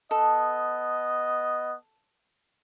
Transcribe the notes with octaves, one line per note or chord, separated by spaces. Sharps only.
B3 A4 D#5